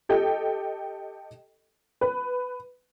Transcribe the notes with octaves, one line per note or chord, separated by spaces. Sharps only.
G4 A4 D#5 G5
B4